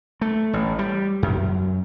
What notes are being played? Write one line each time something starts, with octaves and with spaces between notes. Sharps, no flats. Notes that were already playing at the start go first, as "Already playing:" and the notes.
A3
A1
G3
F#2